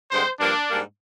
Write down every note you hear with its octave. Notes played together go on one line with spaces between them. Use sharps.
G2 D3 G#3 C4 C5
G2 F3 A#3 D4
G#2 G3 A#3